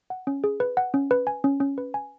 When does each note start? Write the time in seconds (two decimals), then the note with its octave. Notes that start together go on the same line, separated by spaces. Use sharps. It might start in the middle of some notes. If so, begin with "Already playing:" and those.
0.10 F#5
0.27 C#4
0.44 G#4
0.60 B4
0.77 F#5
0.94 C#4
1.11 B4
1.27 G#5
1.44 C#4
1.60 C#4
1.78 B4
1.94 G#5